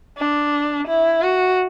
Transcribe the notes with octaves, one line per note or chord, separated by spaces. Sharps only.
D4
E4
F#4